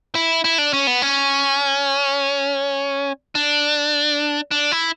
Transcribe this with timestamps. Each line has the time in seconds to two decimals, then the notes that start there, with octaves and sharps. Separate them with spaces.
0.15 E4
0.44 E4
0.58 D4
0.73 C#4
0.87 B3
1.02 C#4
3.35 D4
4.51 D4
4.72 E4